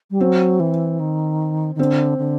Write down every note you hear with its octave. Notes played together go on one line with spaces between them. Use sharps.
G3
F#3 C4
E3
D#3
D#3
D3 C4
D3